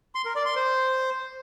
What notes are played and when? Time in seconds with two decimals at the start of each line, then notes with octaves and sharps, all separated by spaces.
0.15 C6
0.25 A#4
0.35 D5
0.46 C6
0.56 C5